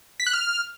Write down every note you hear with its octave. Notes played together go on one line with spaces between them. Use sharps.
B6
F#6
F6